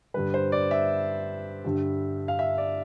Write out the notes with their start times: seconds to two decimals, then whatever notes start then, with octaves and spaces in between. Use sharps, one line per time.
0.14 G2 D3 G3 B4
0.34 C5
0.52 D5
0.71 E5
1.64 G2 D3 G3
2.28 F5
2.39 E5
2.58 D5